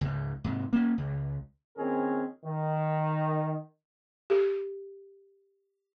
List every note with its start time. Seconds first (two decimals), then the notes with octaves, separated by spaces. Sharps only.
0.01 C#2 G#2
0.44 G#2 C3
0.73 A#3 C#4
0.98 C#2
1.77 A#1 D#3 C4 C#4 G#4 A#4
2.45 D#3
4.30 G4 A4